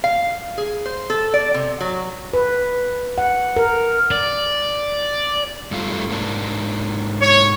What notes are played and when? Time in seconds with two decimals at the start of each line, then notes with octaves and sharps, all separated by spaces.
0.04 F5
0.58 G#4
0.86 C5
1.10 A4
1.34 D5
1.54 C3
1.81 F#3
2.34 B4
3.18 F#5
3.56 A#4
4.11 D5
5.71 G2 A3 F4
6.09 G#2 A#3 D4
7.21 C#5